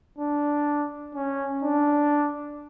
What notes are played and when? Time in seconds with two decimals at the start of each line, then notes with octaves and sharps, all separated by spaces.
0.19 D4
1.15 C#4
1.63 D4